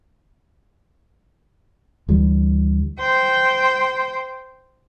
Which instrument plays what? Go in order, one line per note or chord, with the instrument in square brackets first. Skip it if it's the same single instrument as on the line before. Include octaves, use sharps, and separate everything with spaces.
[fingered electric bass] D2 E3 G3
[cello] C5 G5